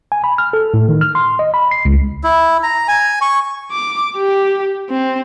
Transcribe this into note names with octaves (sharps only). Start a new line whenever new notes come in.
G#5
B5
F6
A4
A2
D#3
F6
C6
D#5
B5
C7
C#2
E4
A#5
G#5
C#6
D6
G4
C4